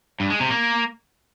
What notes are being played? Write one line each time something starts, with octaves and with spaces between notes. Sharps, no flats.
G2
G#3
C3
A#3